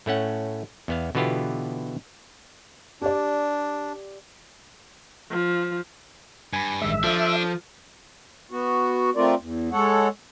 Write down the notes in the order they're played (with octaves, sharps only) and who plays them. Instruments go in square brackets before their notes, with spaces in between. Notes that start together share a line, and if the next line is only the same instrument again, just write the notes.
[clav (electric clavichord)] A2 A3 C#4 F#5
E2 B3 F5
B2 D3 E3 B3 F4 G4
[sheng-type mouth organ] D4 [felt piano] G4 D5
[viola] F3
[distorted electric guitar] G2 [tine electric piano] G#5 B5
[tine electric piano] A1 D#3 G#3 [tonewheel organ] E5
[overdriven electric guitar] F3 [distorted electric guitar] D4 [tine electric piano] A4
[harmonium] B3 F#4
A3 C4 F4 A#4 D5
E2
G#3 A4 C#5 F#5